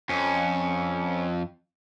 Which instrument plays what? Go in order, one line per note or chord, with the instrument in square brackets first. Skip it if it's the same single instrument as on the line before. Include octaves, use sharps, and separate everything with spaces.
[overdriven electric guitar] F2 [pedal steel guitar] C#4